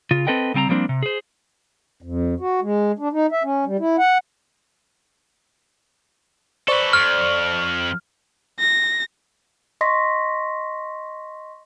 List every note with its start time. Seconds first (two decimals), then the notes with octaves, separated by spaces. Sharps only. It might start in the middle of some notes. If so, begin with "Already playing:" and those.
0.11 C#3 F4
0.27 C4 A4 B4 D#5 G5
0.54 C#3 G3 C4 A5 A#5
0.69 F3 G3 A#3 C4 D4
0.89 C3
1.03 G#4 C5
2.02 F2
2.40 F#4
2.62 G#3
2.99 D4
3.12 D#4
3.32 E5
3.43 C#4
3.66 G3
3.79 E4
3.98 F#5
6.68 A4 B4 C5 D5 C#6
6.93 F2 F6
8.59 A#6
9.81 D#5 C6 C#6 A#6 B6